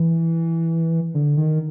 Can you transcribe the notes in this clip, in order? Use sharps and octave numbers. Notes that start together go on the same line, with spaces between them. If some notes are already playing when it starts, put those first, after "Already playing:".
Already playing: E3
D3
D#3